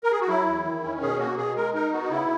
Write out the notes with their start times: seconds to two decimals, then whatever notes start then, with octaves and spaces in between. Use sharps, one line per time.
0.04 A#4
0.11 G#4
0.21 F#4
0.28 F#3 E4
0.47 E2
0.64 D#3
0.83 C#4
1.01 B2 G#4
1.19 A#3 F#4
1.37 B2 G#4
1.56 G#3 A#4
1.74 D#4 A#4
1.92 B3 F#4
2.10 C#3 E4